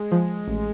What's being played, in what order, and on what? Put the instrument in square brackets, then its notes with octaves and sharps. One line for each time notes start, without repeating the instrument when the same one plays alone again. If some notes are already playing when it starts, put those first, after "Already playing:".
Already playing: [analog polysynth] G#3
[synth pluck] F3
A1